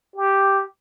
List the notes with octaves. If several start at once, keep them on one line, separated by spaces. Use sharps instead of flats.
G4